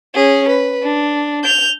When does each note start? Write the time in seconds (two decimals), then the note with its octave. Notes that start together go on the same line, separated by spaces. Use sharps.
0.15 C#4 G#4
0.49 B4
0.82 D4
1.44 G6 F7